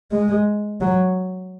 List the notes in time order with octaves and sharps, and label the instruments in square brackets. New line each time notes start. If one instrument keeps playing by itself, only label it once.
[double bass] G#3
F#3